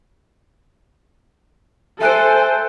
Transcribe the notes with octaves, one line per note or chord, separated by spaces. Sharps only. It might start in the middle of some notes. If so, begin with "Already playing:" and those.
A4 C5 E5 G#5 F#6 D7